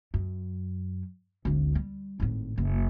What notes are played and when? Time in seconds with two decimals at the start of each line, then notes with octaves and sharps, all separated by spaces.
0.14 F#2
1.45 G#1 D2
1.75 G3
2.20 G#1 A2
2.58 F#1